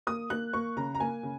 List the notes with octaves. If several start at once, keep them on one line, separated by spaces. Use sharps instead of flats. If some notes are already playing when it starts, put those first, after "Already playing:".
A#3 D#6
A#3 F#6
A#3 C#6
C#3 A#5
A#5
A#3 G#5
C#3